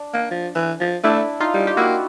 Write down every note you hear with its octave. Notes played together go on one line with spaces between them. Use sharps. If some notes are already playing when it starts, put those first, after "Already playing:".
Already playing: D4
A#3
F3
E3
F3
A3 D4 E4
D#4 F4
G3
G4
A#3 E4 F#4